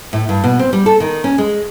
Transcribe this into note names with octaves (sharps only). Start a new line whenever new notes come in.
A2
G2
B2
C4
G3
A4
D#3
C#4
G#3